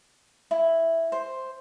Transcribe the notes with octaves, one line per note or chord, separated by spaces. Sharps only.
E4
C5